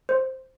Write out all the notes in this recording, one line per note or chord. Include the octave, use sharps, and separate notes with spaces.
C5